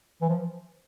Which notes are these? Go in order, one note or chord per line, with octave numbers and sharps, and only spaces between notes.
E3
F3